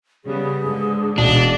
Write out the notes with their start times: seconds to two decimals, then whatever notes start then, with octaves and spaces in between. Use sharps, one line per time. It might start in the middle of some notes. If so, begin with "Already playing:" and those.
0.25 C#3 G3 B3 G#4
0.61 G#2 D3
1.18 E1 D4 D5 D#5